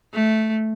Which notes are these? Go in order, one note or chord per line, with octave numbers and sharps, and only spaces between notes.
A3